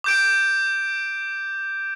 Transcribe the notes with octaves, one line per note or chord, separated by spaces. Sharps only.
D6 G6 D7